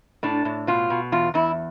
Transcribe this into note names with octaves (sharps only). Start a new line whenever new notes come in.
A2 D4
A2
B2 F4
B2
E2 F4
E2 E4